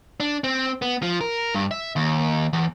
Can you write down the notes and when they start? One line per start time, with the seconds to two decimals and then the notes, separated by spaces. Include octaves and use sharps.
0.20 D4
0.44 C4
0.82 B3
1.03 F3
1.21 A#4
1.55 G2
1.71 E5
1.96 D#2
2.53 E2